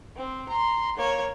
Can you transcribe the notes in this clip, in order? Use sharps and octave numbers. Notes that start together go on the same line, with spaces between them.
C4
A#5 C6
A#3 C#5